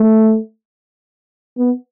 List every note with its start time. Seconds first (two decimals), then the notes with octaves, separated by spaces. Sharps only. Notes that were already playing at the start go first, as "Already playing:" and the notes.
Already playing: A3
1.58 B3